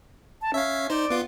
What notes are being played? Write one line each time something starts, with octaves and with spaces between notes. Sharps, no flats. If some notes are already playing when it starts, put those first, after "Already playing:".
A5
C#4 E5 F5
D#4 C5 D5
B3 F4